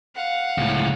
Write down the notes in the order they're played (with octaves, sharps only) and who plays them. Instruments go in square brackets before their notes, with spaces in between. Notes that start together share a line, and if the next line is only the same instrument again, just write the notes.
[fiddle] F5 F#5
[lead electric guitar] C#2 A2